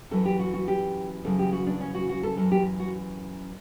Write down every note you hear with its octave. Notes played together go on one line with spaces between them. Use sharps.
F#2 E3 A4
G4
F#4
F#4
G4
F#2 C#3 E3 A4
G4
F#4
D4
C#4
F#4
F#4
A4
F#2 E3 A4
G4
F#4